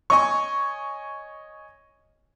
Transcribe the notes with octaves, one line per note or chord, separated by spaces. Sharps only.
C#5 D#5 G#5 C#6